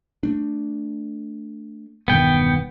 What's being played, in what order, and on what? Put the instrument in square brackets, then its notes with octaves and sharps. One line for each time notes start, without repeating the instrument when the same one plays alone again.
[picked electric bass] A3 D4
[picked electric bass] E1 G2 D#3 [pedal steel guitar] B3 G5